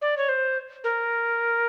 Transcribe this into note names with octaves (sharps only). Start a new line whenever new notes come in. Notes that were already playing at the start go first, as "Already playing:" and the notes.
D5
C#5
C5
A#4